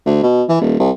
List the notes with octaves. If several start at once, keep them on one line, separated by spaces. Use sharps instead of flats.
D2
B2
E3
D#1
C2